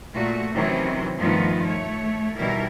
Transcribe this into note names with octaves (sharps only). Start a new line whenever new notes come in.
A#2 A3 F#4
C3 D#3 E3 F#3 C4 C#4
G2 D#3 F3 A3 B3
A3 C#5
B2 D#3 E3 G3 E4 A#4